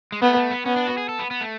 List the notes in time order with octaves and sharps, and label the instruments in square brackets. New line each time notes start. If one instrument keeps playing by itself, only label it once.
[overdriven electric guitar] G#3
[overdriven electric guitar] A3 [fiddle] B3
[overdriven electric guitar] A3
B3
[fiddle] B3 [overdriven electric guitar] C#4
[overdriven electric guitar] D4
F#4
G#4
A4
B3
B3
A3